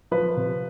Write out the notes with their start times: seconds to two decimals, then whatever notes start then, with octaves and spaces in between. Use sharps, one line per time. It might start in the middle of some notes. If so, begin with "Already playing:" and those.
0.11 F3 B4
0.37 C3